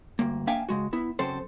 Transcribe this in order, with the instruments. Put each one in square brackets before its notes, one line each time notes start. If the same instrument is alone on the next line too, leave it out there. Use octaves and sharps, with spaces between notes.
[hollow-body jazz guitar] D2 G2 A#3
A#3 D4 E5 F5 G5 G#5
C#3 G#3 F#4
B3 E4
F#2 C#3 C4 A4 C5